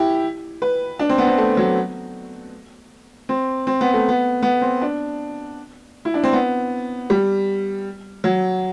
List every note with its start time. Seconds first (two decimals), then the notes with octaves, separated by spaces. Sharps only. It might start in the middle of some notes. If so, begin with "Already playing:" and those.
Already playing: E4 G4
0.62 B4
0.99 D4
1.09 C4
1.18 B3
1.27 C4
1.38 A3
1.57 F#3
3.29 C4
3.67 C4
3.81 B3
3.94 A3
4.09 B3
4.42 B3
4.61 C4
4.82 D4
6.05 E4
6.14 D4
6.24 C4
6.33 B3
7.10 G3
8.24 F#3